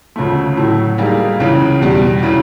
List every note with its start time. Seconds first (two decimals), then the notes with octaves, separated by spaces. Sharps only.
0.16 D2 C#3 F3 A3
0.57 A2 F#3 A3
0.98 G3 A#3 D#4 G#4
1.40 C#2 C#3 E3
1.81 E2 B2 G3
2.23 C#3 E3